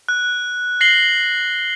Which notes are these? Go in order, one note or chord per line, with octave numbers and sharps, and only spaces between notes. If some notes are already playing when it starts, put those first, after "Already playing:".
F#6
A#6 C7 F#7 G7